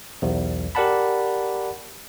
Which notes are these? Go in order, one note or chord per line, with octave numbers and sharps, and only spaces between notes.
B1 E2
G4 A#4 D5 F#5 A5 B5